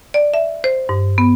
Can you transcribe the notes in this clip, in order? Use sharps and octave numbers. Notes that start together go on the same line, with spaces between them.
D5
E5
C5
G2
B3